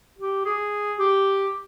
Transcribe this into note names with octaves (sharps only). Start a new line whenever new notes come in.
G4
G#4
G4